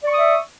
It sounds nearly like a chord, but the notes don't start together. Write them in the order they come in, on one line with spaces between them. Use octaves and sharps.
D5 C#6 D#6 E5